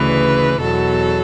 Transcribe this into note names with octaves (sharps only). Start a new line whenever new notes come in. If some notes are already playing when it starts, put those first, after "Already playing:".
Already playing: D2 C#3 E3 B4
E2 B2 F#3 A4